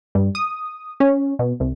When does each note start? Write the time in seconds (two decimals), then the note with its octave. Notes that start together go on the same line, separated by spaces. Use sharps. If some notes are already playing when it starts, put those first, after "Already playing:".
0.15 G2
0.35 D#6
1.00 C#4
1.39 B2
1.60 C2